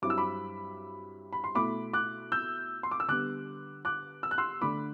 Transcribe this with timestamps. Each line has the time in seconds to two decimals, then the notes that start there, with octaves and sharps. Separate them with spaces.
0.02 G2 F#3 C4 E4 D6
0.10 E6
0.18 B5 D6
1.33 B5
1.44 C6
1.55 B2 A3 E4 B5 D6
1.93 D6 F#6
2.32 E6 G6
2.83 C6
2.91 D6
3.00 E6
3.08 D3 G3 B3 D6 F#6
3.85 D6 F#6
4.23 E6
4.31 F#6
4.38 C6 E6
4.61 D3 A3 D4 B5 D6